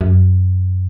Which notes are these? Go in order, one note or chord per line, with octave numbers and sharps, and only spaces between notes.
F#2